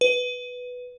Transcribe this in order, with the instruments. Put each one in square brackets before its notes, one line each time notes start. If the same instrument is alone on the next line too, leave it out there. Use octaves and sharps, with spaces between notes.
[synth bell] B4